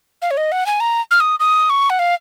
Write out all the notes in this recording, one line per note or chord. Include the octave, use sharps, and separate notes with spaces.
F5
C#5
D#5
F#5
G#5
A#5
F6
D#6
D#6
C#6
F#5
F5